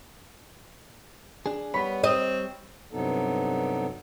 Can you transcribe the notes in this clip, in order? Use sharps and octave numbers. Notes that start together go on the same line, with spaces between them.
D4 G#4
G3 B3 C#5 B5
C4 D#5
G2 C3 F#3 B3 D#4 A4